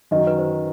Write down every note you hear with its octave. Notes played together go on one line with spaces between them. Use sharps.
F#2 D#3 F#3 D#5
B4
C5